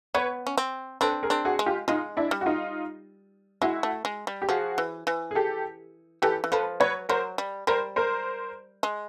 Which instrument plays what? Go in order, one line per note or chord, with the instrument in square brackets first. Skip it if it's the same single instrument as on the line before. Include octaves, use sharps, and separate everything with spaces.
[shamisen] B3 [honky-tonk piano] B4 C#5
[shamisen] C#4
C4
[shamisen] C4 D4 [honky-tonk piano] A4 B4
[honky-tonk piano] G#4 A#4
[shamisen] C4 D4
[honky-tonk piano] F#4 G#4
[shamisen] G#3
[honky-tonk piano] F4 G4
[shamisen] G#3 [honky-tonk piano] D#4 F4
[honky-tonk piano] D4 E4
[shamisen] G3
[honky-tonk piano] F#4
D#4 F4
[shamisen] G#3 [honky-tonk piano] E4 F#4
[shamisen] A3
G#3
G3
[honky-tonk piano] G4
[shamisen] F3 [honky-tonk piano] F#4 G#4
[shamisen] E3
E3
[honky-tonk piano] G#4
G4 A4
[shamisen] E3 [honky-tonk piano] G4 A4
[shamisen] E3
[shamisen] F3 [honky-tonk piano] A4 B4
[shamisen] F#3 [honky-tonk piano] B4 C#5
[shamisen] F#3 [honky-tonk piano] A#4 C5
[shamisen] G3
[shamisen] G3 [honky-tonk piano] A#4 C5
[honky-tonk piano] A#4 C5
[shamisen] G#3